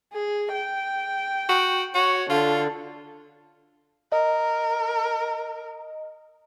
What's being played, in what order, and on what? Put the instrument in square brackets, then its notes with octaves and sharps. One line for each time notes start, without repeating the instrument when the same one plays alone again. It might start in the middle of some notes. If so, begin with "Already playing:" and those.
[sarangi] G#4
G5
[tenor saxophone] F#4
[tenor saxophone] F#4 [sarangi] C#5
[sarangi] D3 [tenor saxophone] F4
[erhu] A#4 [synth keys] D#5